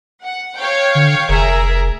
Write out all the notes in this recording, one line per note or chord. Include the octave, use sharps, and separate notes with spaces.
F#5
C#5 F5 G5
D3
F1 G#4 A#4 E5